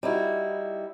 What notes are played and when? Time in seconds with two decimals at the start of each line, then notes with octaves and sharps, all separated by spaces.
0.03 G3 D#4 E4 F#4